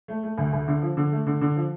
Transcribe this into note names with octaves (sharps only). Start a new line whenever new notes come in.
A3
A3
D2
D2
D3
F3
D3
A3
D3
D3
F3